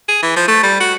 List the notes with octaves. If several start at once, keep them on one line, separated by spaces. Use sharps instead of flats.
G#4
E3
F3
A3
G3
F#4